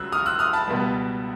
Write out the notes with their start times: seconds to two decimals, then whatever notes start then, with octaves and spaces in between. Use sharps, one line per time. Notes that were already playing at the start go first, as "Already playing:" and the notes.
Already playing: C#2 C#3 F#3 E6 F#6
0.12 D#6 F6
0.26 E6 F#6
0.39 D#6 F6
0.53 A5 B5
0.67 C#2 B2 G3 B3